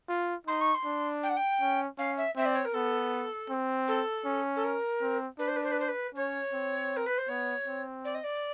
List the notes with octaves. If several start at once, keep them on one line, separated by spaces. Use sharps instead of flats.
F4
D#4 C6
C#6
C6
D4
G5
F#5
G5
C#4
C#4 F5
E5
C4 E5
D5
C#5
A#4
B3 A4
C4
A4
C#4
A4
A#4
C4
D4 B4
C5
B4
C5
B4
C5
B4
C#4 C#5
C4
A#4
B4
C5
B3 C#5
C4
D5
D#5
D5